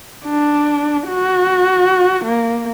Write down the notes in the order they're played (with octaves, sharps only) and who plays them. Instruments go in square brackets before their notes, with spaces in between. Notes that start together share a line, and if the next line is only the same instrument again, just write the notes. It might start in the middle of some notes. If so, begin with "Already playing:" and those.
[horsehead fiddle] D4
F#4
A#3